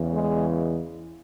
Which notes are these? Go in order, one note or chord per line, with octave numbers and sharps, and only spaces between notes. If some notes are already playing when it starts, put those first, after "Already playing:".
Already playing: E2 C#3 E3
G#3